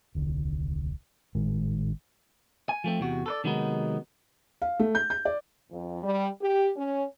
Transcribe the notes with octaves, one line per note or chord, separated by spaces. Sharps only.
D#1 C2 D3
G#1 A2 D#3 G#3
G#5
F3 A3 C4
E2 C3 F#4
A4 B4 D5
C3 D#3 F#3 G#3 B3 D#4
F5
A3
G6
G6
D5
F2
G3
G4
C#4